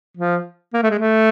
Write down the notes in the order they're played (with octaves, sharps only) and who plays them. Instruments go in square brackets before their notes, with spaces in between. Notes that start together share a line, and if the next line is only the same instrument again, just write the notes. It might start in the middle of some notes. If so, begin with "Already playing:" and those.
[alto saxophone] F3
A#3
A3
G#3
A3